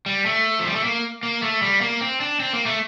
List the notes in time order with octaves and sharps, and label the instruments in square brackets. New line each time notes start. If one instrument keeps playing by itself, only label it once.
[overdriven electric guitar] G3
A3
F3
G3
A3
A#3
A#3
A3
G3
A#3
C4
D4
C4
A#3
A3